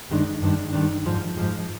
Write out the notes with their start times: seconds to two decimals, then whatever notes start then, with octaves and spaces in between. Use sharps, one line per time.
0.10 G2 D#3 G#3 D4
0.42 G2 D#3 G#3 D4
0.73 G2 D#3 G#3 D4
1.05 G#2 F3 G#3
1.37 G#2 F3 G#3